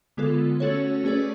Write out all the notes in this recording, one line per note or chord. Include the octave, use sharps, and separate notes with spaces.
D3 G#3 B3 F4 A4
A3 C#4 F#4 A4 C#5
A3 C#4 G#4 B4 D5